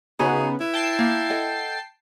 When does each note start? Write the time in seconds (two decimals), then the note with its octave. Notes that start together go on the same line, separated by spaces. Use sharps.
0.19 C#3 B3 D#4 F#4 G#4
0.61 E4 B4
0.74 G5 A5 C7
0.99 A#3
1.30 A4 D#5 F#5